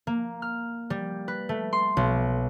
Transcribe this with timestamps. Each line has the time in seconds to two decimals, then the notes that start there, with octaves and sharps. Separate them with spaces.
0.07 A#3
0.42 F6
0.90 G3
1.28 B4
1.49 A3
1.73 C6
1.97 B1